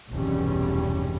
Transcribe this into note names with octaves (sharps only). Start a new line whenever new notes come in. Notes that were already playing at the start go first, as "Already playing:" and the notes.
F1 B1 E2 G2 G3 C#4